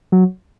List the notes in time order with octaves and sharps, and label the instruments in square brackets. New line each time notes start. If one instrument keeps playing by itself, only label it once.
[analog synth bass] F#3